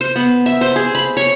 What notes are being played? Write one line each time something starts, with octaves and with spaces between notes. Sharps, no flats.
C5
B3
E5
C5
G#4
B5
C#5